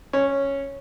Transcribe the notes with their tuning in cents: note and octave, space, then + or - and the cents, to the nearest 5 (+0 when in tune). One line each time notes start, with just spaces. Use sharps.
C#4 -5